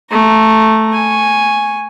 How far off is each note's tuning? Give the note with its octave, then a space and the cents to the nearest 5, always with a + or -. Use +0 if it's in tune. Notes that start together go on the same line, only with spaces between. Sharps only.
A3 +0 A#5 +0
G#5 +0 C#6 -5